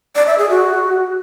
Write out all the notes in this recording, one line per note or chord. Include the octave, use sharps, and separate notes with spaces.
D5
E5
G#4
F#4